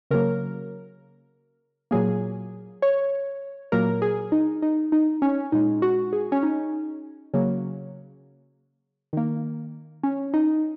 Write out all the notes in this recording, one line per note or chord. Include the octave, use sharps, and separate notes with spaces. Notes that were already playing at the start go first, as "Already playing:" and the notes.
C#3 F#3 A#3 A#4
A#2 F#3 A#3 G#4
C#5
A#2 F#3 A#3 A#4
G#4
D#4
D#4
D#4
C#4
A#2 G#3 D#4
F#4
G#4
C#4
D#4
C#3 F#3 A#3
D#3 A#3
C#4
D#4